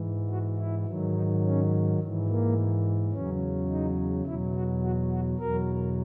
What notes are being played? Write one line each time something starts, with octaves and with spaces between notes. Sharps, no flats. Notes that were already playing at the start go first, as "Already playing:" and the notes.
Already playing: G#2 E3
F#4
E4
G#2 D#3 F#3
D#4
C#4
G#2 E3
A#3
E2 C#3 F#3 C#4
D#4
E2 B2 F#3 E4
F#4
F#4
F#4
E2 B2 F#3 A#4